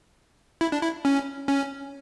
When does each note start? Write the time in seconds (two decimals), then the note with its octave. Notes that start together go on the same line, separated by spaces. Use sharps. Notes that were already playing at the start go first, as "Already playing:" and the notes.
0.61 E4
0.72 D4
0.83 E4
1.05 C#4
1.48 C#4